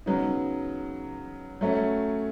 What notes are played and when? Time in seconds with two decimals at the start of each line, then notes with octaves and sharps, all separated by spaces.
0.06 C#3 F#3 B3 D#4
1.61 F#3 A3 C#4